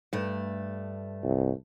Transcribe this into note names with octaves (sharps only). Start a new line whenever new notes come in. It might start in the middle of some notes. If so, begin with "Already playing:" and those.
G2 A3
C2